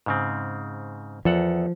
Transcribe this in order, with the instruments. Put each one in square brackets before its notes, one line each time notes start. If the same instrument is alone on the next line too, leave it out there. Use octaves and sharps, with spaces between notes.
[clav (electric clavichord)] G#2 C#3 C4
[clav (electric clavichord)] E2 A4 F#5 [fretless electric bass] F3